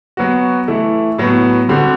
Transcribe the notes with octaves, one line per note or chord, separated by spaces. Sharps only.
F#3 B3 F#4
E3 A3 E4
A2 F#3 B3
D3 G3 C4 F#4 C5